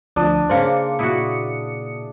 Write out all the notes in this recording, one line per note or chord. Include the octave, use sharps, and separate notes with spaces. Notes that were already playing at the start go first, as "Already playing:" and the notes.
D2 F3 D4 D#6
C#3 A#3 C5 D5 C#7
A#2 E4 F#4 D#6 C#7